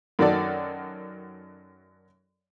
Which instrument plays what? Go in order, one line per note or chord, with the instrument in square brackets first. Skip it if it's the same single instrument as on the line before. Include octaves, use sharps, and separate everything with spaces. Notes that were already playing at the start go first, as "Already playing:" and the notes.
[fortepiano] F#2 D#3 F#4 A4 D5